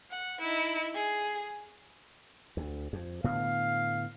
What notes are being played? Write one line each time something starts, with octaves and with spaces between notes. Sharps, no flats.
F#5
D#4 E4
G#4
D2
F2
A2 D3 B3 F5